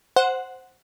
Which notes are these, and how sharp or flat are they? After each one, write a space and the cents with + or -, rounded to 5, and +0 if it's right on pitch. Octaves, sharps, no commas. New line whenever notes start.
C5 +0 F#5 +0